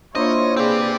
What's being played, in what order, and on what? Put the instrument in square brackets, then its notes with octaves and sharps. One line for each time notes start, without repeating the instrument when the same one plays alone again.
[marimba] A#3 D4 [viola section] E4 F4 C#5 [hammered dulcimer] C5 [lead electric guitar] D#5
[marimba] A#3 F5 [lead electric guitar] C4 G4 [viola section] G#4 B4 D5